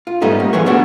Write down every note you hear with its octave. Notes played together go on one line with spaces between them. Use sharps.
F4
G#2 G3 A3 B3 C#4 D#4
A#3
D3 E3 F3 G#4 B4 C#5
A3 B3 D4 F#4 F#5 G#5